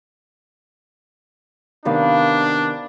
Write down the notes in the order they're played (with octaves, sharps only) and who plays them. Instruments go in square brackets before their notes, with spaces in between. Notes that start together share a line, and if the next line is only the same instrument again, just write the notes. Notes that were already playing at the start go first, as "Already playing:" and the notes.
[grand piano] C3 D#3 B3 [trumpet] D4 [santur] D5 F5 B5